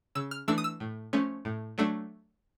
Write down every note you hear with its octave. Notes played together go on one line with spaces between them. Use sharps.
C#3 E6
F6
E3 A3 D4 E6
D#6
E6
A2
F3 A3 C#4
A2
F#3 A3 D4